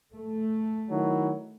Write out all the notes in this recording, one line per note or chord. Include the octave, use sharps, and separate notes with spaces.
A3
D#3 F#3 E4